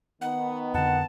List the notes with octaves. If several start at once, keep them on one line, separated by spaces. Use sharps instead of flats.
D#3 B3 F#5
F2 D3 F#5 A5